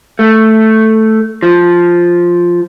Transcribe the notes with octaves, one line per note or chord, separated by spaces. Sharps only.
A3
F3